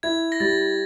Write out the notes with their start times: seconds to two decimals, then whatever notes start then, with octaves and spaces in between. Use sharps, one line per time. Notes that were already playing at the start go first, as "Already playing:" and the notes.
0.03 E4 G#6
0.32 A#6
0.40 G3 A6